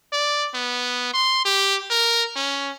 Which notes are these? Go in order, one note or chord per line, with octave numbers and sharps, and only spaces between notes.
D5
B3
C6
G4
A#4
C#4